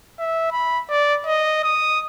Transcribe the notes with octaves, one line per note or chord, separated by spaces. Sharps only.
E5
B5
D5
D#5
D#6